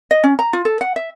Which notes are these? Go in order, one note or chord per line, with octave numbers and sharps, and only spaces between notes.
D#5
C#4
A#5
F4
A4
F#5
E5